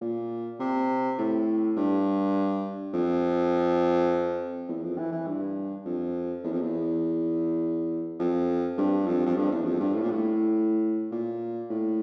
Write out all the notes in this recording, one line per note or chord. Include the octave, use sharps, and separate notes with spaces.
A#2
C3
A2
G2
F2
E2
F2
E3
E3
G2
F2
E2
F2
E2
F2
G2
F2
F2
G2
E2
F2
G2
A2
A#2
A2
A#2
A2